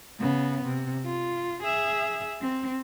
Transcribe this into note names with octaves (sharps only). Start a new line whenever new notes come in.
C#3 B3
C3
F4
G#4 E5
C4